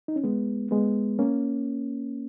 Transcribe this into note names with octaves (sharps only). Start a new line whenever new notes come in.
D#4
C#4
G#3 B3
G#3 B3
A#3 C#4